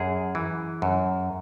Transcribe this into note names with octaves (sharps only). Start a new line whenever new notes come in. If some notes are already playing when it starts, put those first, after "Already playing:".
Already playing: F#2 G#4
E3
F#2